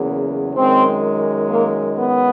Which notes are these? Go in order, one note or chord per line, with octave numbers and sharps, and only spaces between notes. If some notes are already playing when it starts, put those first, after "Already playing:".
Already playing: E2 C#3 F#3 A#3
F#2 D#3 G#3 C4
A#3
B3